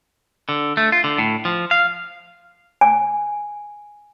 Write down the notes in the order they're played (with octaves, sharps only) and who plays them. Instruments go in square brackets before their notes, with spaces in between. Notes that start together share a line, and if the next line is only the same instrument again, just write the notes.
[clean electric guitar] D3
A3
F4
D3
A2
F3
F5
[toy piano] G#5